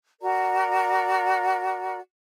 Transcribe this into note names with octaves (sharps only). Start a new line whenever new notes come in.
F#4 A#4 D5 A#5